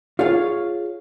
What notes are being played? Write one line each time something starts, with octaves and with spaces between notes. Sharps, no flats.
F4 G#4 C#5 F5